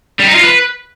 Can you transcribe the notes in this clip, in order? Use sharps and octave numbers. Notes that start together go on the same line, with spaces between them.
G3
D#4
F4
B4